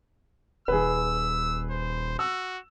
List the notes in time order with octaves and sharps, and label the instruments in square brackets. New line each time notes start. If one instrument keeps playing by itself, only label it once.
[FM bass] D#1 [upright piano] G#4 B4 [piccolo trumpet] E6
[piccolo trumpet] C5
[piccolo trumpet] F#4 [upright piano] E6